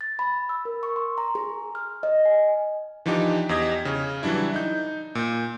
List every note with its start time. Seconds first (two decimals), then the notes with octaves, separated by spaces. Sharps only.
0.01 A6
0.19 B5
0.49 E6
0.65 A#4
0.83 C#6
0.96 C6
1.18 A#5
1.35 G#4
1.75 F6
2.03 D#5
2.25 G#5
3.06 E3 F3 D4 D#4 G4
3.49 E2 G4 D#5 G#6
3.85 C#3 C#4
4.23 E3 F#3 G3 D4 E4
4.53 D#4 G6
5.15 A#2 G6